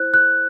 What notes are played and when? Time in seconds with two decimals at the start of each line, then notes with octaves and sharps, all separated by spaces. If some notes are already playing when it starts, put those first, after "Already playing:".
Already playing: E4 C5 F#6
0.14 F#6